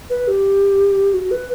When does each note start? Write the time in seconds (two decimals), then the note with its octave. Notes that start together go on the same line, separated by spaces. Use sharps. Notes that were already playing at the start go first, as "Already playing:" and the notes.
0.10 B4
0.28 G4
1.14 F#4
1.31 B4